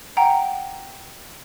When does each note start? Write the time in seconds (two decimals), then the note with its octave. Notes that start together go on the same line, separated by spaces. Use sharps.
0.17 F#5 G5 A#5